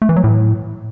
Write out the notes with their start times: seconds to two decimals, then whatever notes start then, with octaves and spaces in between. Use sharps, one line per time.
0.02 A3
0.09 E3
0.16 F#3
0.24 A2